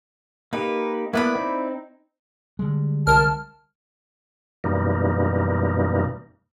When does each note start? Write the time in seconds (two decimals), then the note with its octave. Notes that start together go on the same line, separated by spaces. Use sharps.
0.53 A#3 D#4 G4 B4
1.13 A#3 B3 E4 B4 D5 B5
1.36 C4 D#4
2.59 D3 G3 G#3
3.07 C2 A#4 A5 F6
4.64 F#2 B2 E3 G3 A#3 D#4